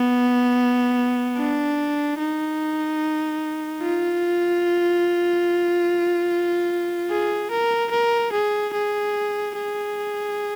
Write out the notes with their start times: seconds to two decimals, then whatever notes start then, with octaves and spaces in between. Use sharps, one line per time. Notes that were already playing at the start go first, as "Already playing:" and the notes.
Already playing: B3
1.37 D4
2.19 D#4
3.82 F4
7.10 G#4
7.51 A#4
7.91 A#4
8.33 G#4
8.74 G#4
9.56 G#4